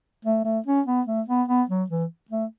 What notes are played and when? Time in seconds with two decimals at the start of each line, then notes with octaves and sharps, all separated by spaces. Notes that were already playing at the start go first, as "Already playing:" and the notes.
0.25 A3
0.45 A3
0.66 C#4
0.87 B3
1.07 A3
1.28 B3
1.48 B3
1.69 F#3
1.90 E3
2.30 A3